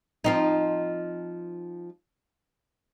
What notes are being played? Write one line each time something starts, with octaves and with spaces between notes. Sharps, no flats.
F3 C4 D#4